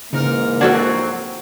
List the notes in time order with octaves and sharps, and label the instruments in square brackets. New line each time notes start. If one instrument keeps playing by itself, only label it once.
[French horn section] G#2 E3 A#3 [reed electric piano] C#3 [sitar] D#4 A#4
[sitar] F3 F#3 C4 [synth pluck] D4 F#4 A4 [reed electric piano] F#5 G#6